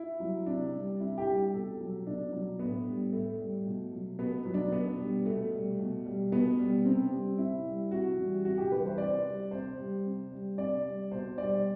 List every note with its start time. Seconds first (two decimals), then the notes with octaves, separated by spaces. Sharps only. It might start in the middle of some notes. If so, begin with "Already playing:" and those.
Already playing: E4
0.20 F#3
0.46 C3 D4
0.73 G3
0.99 C3 E4
1.18 G4
1.26 G3
1.53 B2 A4
1.80 F#3
2.06 B2 D4
2.32 F#3
2.59 A2 B3
2.86 G3
3.12 A2 A3
3.39 G3
3.66 B2
3.93 F#3
4.19 B2 B3
4.45 F#3
4.54 D4
4.72 B2 B3
4.99 G3
5.25 B2 A3
5.52 G3
5.79 B2
6.06 G3
6.32 B2 B3
6.59 G3
6.85 C3 C4
7.12 G3
7.38 C3 E4
7.65 G3
7.91 C3 F#4
8.18 E3 G3
8.45 C3 F#4
8.58 G4
8.72 E3 G3 B4
8.85 C5
8.98 C3 D5
9.25 G3
9.51 C3 C5
9.78 G3
10.05 C3
10.31 G3
10.58 C3 D5
10.85 G3
11.11 B2 C5
11.38 G3 D5